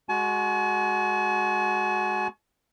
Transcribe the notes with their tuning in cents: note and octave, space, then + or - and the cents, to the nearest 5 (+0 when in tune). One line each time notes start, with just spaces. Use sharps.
G#3 +0 F#4 +0 G#5 +45